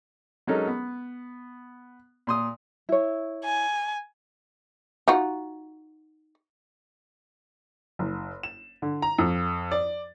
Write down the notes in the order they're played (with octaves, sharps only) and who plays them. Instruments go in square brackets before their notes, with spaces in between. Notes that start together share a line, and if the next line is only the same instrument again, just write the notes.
[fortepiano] F#3 G#3 C#4 D#4 A4 A#4
B3
A#2 C6 D#6
[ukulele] E4 C#5
[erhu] G#5
[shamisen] D#4 F4 F#4
[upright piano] F#1
E7
D3
A#5
F2
D5